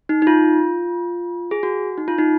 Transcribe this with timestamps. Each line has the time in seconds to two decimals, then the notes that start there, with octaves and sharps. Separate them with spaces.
0.09 D#4
0.22 D#4
0.27 F4
1.51 G#4
1.63 F#4
1.98 D#4
2.08 F4
2.18 D#4